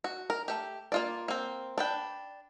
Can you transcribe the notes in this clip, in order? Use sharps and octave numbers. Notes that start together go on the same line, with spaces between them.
F#4
A#4
A3 G4
A#3 F4 D5
A#3 C4
D4 B4 G5